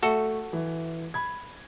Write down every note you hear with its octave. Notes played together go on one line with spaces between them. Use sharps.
A3 F#4 A4
E3
B5 G#6